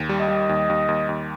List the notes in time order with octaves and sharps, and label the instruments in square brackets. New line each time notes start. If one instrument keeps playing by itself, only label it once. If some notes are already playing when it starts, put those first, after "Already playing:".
Already playing: [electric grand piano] D#2
G3
[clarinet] D#5
[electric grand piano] G3
D#2
D#2
D#2
D#2